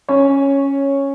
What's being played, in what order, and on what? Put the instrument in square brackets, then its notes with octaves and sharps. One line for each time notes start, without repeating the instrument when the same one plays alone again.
[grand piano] C#4 C#5